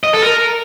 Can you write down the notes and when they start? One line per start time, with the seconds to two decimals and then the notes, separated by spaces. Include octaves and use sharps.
0.04 D#5
0.13 A4
0.23 A#4